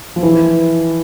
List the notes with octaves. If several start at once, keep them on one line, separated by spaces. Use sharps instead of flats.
F3
E3